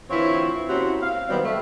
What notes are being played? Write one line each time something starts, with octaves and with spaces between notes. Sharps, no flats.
D2 E3 C4 E4 F4 C#5
A#3 C4 C#4 E4 F#4 G4
F5
D#3 F#3 G3 B3 C4
A3